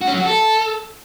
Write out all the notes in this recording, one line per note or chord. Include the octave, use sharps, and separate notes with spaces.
F#4
C#4
F#3
F#4
A4